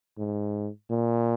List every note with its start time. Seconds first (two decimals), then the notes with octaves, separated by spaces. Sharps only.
0.18 G#2
0.90 A#2